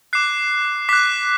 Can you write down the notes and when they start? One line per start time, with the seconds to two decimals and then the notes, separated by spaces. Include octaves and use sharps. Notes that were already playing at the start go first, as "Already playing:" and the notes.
0.13 D6 F#6 C7
0.89 D6 F#6 B6